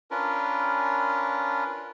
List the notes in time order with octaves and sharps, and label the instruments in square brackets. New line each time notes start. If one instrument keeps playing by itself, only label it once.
[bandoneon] C#4 D4 F4 A#4 B4